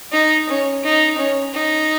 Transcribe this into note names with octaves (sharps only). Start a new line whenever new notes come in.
D#4
C#4
D#4
C#4
D#4